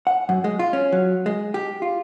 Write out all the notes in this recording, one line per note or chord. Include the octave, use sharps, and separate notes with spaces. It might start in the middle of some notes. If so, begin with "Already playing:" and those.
F#5
F#2
G#3
F4
C#4
F#3
G#3
G4
F4